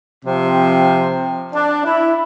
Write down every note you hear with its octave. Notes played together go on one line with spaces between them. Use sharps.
C3 F3 C4
D4
E4